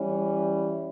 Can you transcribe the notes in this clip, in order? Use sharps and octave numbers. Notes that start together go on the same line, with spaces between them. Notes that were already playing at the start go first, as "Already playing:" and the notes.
Already playing: E3 G3 C#4